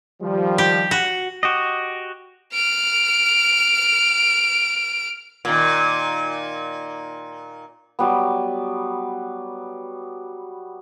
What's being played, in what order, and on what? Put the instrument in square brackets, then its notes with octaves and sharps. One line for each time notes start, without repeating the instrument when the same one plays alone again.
[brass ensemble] D#3 F3 G3
[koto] G4
F#4
[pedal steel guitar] F#4 G4 D#5
[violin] F6 D7
[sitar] A#2 D#3
[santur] F#3 G3 B3